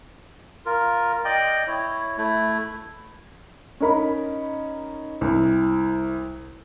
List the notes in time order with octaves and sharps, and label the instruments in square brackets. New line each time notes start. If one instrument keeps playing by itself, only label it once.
[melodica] F4 A#4
D5 D#5 G5
E4 C#5
A3 E4
[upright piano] C#4 D#4 A#4 B5
C2